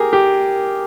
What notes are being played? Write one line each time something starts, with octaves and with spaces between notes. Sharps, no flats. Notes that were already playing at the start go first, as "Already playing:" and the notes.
Already playing: G4 G#4 A#4
G4